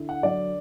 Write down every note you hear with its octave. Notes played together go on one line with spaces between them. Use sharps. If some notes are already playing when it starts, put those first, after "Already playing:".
Already playing: D3 E4
F#5
F#3 D5